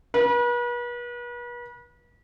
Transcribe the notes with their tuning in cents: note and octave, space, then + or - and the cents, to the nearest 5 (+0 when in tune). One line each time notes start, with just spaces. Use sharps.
B4 -40